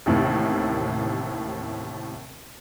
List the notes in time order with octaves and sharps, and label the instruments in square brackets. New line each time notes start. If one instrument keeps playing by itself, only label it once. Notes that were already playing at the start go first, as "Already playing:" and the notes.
[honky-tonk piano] A1 D#2 A2 C3 D#3